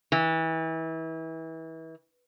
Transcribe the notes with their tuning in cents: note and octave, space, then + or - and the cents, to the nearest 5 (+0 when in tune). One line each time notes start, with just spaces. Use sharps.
E3 -30